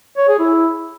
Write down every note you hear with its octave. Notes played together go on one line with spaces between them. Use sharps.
C#5
G#4
E4